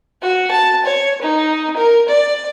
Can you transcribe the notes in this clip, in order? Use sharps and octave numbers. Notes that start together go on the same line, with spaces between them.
F#4
A5
C#5
D#4
A#4
D5